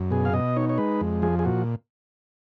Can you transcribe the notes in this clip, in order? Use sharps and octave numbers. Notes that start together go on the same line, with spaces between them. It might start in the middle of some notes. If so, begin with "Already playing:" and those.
Already playing: F#2
B2 G#4
F5
B2 D#5
D#4 C#5
C#5
G#3 B4
F2
F3 G#4
G#4
A#2 F#4